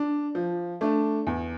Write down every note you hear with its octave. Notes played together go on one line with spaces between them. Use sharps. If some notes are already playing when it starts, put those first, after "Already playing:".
Already playing: D4
F3
A3 D4
E2